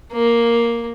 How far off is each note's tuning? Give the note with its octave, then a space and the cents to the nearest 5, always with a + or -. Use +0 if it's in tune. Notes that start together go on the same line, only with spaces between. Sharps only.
A#3 +5